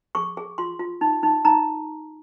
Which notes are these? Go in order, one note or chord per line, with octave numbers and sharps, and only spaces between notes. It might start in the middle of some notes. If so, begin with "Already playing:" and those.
G#4 C#6
G#4
F4 C6
F4
D#4
D#4
D#4 A#5